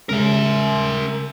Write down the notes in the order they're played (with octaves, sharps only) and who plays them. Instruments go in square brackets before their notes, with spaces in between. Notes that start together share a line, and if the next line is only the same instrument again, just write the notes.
[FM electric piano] C#3 G#3 C#4 [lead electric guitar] A#4 E5